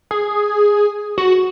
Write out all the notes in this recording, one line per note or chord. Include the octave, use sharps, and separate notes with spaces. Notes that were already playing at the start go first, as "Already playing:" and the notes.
G#4
F#4